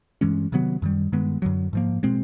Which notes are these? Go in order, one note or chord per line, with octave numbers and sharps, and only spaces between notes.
G2 E3 G#3 C#4
C3 D#3 F#3 B3
F#2 D#3 G3
G2 D#3 G#3 B3
F#2 D3 F#3
G#2 F3 A#3
B2 G#3 C4